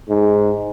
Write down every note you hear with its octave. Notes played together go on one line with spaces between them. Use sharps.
G#2